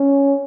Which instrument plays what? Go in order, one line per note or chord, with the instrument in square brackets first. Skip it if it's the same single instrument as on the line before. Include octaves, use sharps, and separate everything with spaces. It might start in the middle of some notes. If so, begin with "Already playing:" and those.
Already playing: [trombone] C#4